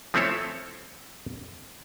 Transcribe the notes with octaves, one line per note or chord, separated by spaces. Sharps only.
F3 A3 C4 E4 A4 C#5